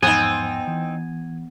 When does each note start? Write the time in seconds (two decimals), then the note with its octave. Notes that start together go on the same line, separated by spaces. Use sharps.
0.03 E2 G#2 F3 B3 C4 D#4 G#5
0.67 E3